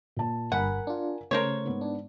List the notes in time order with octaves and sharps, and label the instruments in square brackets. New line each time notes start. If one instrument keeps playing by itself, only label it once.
[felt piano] A#2 A5
[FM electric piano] G1 G2 B5 [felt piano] A#4 G#5 A#5 [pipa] F#5
[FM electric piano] D4 F4
[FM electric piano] C#3 [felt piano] A3 [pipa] A#4 C5 C#5
[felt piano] G#2 B3
[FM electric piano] D4